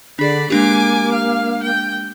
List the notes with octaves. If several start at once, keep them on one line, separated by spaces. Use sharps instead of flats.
D3 D4 G#4 D5 B5
G#3 A#3 D4 G4 G#5 D6
F5
G5